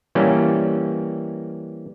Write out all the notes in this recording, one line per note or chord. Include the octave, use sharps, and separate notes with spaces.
E3 G3 A#3 C#4